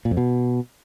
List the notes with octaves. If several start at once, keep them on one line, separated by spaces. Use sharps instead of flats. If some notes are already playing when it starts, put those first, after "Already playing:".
A#2
F2
B2